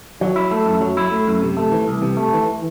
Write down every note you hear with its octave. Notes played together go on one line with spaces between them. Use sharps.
F#3
E4
A3
F#2
F#3
E4
A3
F#2
C3
A3
E3
C2
C3
A3
E3